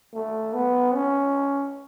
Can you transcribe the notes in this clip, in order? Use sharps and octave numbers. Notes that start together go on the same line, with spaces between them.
A3
B3
C#4